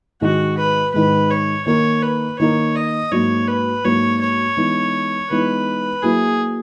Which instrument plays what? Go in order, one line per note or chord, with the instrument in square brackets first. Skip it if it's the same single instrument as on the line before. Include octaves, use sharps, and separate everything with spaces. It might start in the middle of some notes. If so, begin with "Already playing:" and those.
[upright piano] G#2 D#3 G#3 [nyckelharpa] F#4
[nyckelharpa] B4
[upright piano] G#2 D#3 G#3 [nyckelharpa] B4
[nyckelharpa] C#5
[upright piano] D#3 A#3 D#4 A#4 [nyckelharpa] C#5
[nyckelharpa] B4
[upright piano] D#3 A#3 D#4 A#4 [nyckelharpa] C#5
[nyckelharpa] D#5
[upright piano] G#2 F#3 A#3 [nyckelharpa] C#5
[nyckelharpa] B4
[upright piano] G#2 F#3 A#3 [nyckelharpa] C#5
[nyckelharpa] C#5
[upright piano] E3 G#3 B3 D#4
[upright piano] E3 G#3 B3 D#4 [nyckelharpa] B4
[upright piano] F#3 A#3 E4 [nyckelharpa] G#4